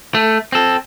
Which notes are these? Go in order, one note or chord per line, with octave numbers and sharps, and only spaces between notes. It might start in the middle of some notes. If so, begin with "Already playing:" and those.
A3
C4 A4